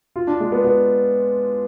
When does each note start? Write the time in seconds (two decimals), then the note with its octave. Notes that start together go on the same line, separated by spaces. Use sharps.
0.16 F4
0.27 D4
0.40 G#3
0.52 B3
0.64 B3